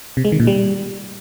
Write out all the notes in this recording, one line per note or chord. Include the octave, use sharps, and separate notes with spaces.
C3
G#3
D#3
A#2
G3